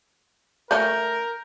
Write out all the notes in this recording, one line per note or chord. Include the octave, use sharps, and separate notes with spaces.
A3 C#4 A#4 G6